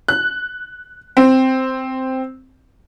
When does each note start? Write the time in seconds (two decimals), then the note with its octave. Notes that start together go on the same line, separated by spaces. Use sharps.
0.08 F#6
1.17 C4